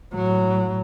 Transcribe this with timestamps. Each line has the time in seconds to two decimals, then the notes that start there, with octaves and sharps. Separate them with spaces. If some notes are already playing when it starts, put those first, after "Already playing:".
0.14 A2 F#3